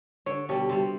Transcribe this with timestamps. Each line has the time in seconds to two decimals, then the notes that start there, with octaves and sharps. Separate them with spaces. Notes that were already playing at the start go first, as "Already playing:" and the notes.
0.26 D3 C#5
0.49 B2 G3 G4 A4 C#5
0.69 C3 G3